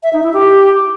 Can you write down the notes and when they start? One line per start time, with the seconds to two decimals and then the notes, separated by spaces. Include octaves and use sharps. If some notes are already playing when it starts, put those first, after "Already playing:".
0.03 E5
0.13 D#4
0.23 E4
0.33 G4